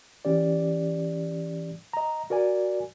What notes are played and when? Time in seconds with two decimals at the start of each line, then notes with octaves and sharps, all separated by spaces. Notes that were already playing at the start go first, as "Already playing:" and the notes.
0.25 E3 C#4 G4 D5
1.93 D#5 A#5
2.30 F#4 A#4 D5 G#5